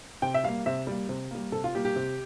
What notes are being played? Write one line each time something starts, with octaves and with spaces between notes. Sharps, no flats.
C3 G5
E5
G3 A#3 F5
C3 E5
G3 A#3
C3
G3 A#3
C3 A4
F4
G3 A#3 G4
G4
C3